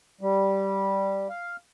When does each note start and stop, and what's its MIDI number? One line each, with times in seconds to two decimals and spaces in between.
0.21 1.27 55
1.29 1.56 77